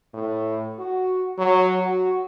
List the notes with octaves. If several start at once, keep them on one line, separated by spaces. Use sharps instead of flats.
A2
F#4
F#3
F#4